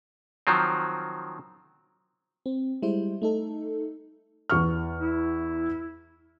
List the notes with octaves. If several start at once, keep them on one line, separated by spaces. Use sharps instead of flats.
D#3 F3 F#3 C4
C4
G3 G#3 E4 C5
A3 D#4 A4
E2 C#6 F6
E4